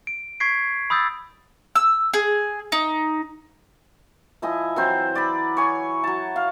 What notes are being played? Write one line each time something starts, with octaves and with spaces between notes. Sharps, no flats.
D7
C#6 G#6 B6 C7 D7
B5 D#6 E6 G6 A6
E6
G#4
D#4
F3 E4 D#5 G#5
E3 F#3 C4 C5
D5 B5
C#5 G#5
F#3 A5
F5